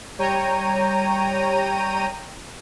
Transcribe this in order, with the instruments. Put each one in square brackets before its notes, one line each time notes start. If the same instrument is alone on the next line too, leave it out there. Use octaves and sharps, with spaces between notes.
[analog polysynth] G3 C#5 G5 A#5 D#7